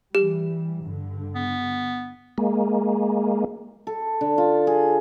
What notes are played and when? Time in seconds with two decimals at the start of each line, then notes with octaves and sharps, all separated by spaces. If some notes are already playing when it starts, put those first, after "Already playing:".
0.15 E3 G3 G4
0.83 G2 D3
1.35 B3
2.38 G#3 A#3
3.87 A4
4.21 D3
4.38 F4
4.67 G#4